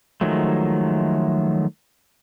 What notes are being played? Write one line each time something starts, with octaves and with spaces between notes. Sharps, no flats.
D#3 F3 F#3 G#3 A3